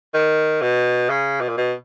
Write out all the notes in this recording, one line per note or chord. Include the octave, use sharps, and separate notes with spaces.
D#3
B2
C#3
B2
A#2
B2